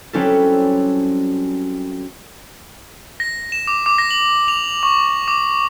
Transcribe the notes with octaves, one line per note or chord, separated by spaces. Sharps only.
F#3 G3 C4 C#4 E4 A4
A#6
E7
D6
D6
A#6
F#7
F7
C#6
D6